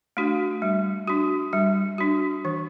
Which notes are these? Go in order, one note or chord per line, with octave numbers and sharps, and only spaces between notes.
A3 D4 F#4
G3
D4 F#4
G3
D4 F#4
E3